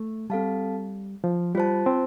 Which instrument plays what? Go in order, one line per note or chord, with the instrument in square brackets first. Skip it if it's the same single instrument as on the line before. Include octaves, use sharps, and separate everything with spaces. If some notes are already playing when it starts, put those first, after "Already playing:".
Already playing: [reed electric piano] A3
[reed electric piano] G3 [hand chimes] C4 A4 F5 A5
[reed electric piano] F3
[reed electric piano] G3 [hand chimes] F4 C5 A5
[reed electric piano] C4